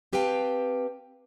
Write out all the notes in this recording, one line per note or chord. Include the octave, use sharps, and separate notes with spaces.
C4 G4 B4 F5 G5 A5